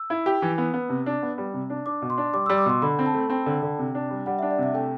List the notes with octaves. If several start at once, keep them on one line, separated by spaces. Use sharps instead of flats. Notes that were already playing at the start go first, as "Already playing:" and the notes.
Already playing: E6
E4
G4
E3
B3
B3
C3
D4
B3
G3
C3
D4
D4 D6
B2
C6
D4
G3 D6
G3 E6
D6
B2 C6
D3 B5
C4
A5
A3
C4 G5
D3
D3
C3
D4
G3
G3 F#5
D4 E5
D5
C3 E5
A3 G5